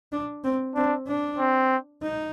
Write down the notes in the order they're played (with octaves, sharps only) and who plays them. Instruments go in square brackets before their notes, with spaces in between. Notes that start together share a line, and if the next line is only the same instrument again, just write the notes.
[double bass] D4
C4
[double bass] C4 [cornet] D4
[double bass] D4
[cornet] C4
[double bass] D#4